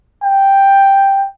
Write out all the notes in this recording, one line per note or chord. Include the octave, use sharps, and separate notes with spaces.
G5